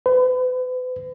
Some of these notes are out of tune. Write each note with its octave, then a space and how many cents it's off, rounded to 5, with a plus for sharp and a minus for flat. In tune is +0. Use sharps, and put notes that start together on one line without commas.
B4 +40